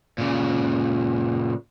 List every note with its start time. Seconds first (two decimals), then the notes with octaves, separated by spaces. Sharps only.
0.18 A#2 C#3